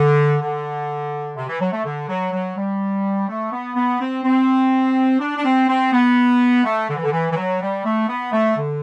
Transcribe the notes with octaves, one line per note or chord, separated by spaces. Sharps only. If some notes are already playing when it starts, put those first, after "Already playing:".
Already playing: D3
D3
C3
E3
F#3
A3
D3
F#3
F#3
G3
A3
B3
B3
C4
C4
D4
D4
C4
C4
B3
A3
D3
E3
D3
E3
E3
F#3
G3
A3
B3
A3
D3